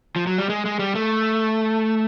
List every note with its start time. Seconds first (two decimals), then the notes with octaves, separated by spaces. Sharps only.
0.16 F3
0.27 F#3
0.39 G3
0.49 G#3
0.66 G#3
0.79 G3
0.95 A3